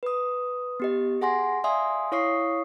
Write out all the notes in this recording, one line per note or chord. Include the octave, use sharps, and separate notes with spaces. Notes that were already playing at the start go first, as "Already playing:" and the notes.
B4 D#6
B3 G4 D#5
G#4 F#5 G#5 C6 A#6
D5 E5 F5 G#5 C6 D#6
E4 C#5 F5 C#6 D#6 C7